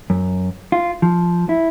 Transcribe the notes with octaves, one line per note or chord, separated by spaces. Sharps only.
F#2
F4
F3
E4